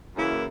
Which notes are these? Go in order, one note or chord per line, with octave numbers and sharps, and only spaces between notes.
F#2 C#3 E3 A#3 E4